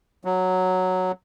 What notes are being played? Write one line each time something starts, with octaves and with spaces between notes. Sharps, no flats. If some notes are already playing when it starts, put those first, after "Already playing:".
F#3